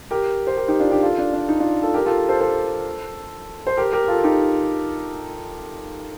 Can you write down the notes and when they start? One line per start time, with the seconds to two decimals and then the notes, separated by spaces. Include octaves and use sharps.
0.11 G4 A#4
0.47 C5
0.57 G4 A#4
0.68 D#4 G4
0.80 D4 F4
0.91 D#4 G4
1.03 F4 A4
1.18 D4
1.33 D4
1.49 D#4
1.60 D4 F4
1.82 F4 A4
1.94 G4 A#4
2.06 F4 A4
2.29 A4 C5
2.40 A4 C5
3.67 C5
3.77 G4 A#4
3.93 G4 A#4
4.08 F4 A4
4.24 D#4 G4